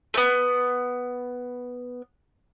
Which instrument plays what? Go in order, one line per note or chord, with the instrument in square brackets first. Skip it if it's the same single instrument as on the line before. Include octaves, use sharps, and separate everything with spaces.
[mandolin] A3 B3